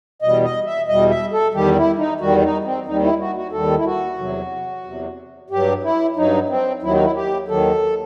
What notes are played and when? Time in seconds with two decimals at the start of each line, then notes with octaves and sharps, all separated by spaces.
0.22 E2 B2 G3 D#5
0.44 D#5
0.66 E5
0.88 E2 B2 G3 D#5
1.10 E5
1.32 A4
1.54 E2 D#3 G3 G4
1.76 E4
1.98 D#4
2.20 E2 D#3 G3 F#4
2.42 D#4
2.64 C4
2.86 D#2 D#3 G3 D#4
3.03 E4
3.20 F#4
3.36 F#4
3.52 D#2 D#3 G3 A4
3.77 E4
3.85 F#4
4.18 E2 C3 F#3
4.84 E2 C3 F#3
5.50 G2 F#3 G4
5.83 E4
6.16 G2 F#3 D#4
6.50 C4
6.82 D#2 D#3 F#3 E4
6.93 D#4
7.03 E4
7.15 G4
7.48 D#2 D#3 F#3 A4